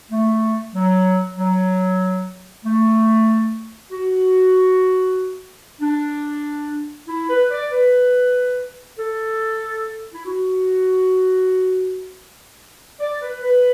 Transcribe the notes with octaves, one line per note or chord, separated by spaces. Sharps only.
A3
F#3
F#3
A3
F#4
D4
E4
B4
D5
B4
A4
E4
F#4
D5
B4
B4